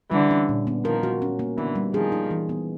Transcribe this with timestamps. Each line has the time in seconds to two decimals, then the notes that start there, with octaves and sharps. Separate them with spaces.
0.11 D3 E3 G3
0.31 C#4
0.49 A#2
0.67 B3
0.84 D#3 F3 A#4
1.03 F#4
1.22 C#4
1.39 A#3
1.57 D3 E3 B3
1.75 G3
1.94 D#3 F3 G#4
2.12 D#4
2.31 E3
2.49 B3